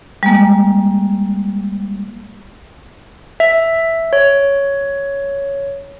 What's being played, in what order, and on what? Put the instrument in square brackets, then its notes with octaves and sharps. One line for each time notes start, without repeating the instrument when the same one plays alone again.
[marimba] G3 G#3 A#3
[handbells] E5
C#5